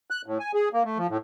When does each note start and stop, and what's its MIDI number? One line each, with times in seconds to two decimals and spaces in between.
0.10 0.22 90
0.26 0.38 45
0.40 0.52 80
0.54 0.69 68
0.73 0.83 58
0.85 0.98 57
0.98 1.07 53
1.10 1.17 45